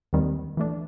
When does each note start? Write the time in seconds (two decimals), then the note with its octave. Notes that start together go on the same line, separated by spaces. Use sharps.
0.13 D#2 D#3 G3 C4
0.57 E3 A3 D4